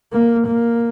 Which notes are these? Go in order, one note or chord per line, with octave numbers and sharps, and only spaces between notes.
A#3
A#3